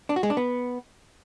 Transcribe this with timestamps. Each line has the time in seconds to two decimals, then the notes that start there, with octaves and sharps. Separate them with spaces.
0.09 D4
0.16 F#4
0.23 G#3
0.30 D4
0.37 B3